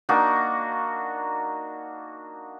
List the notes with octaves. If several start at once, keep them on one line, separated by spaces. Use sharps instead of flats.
A#3 D4 D#4 F#4